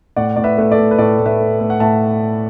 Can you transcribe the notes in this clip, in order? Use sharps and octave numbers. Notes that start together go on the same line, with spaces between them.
A2 D5 F#5
A2 D5
B4 E5
A3 B4
A4 D5
A3
B4
A2 A4 D5
A2
B4 E5
A3
A3
F#5
A2 E5 A5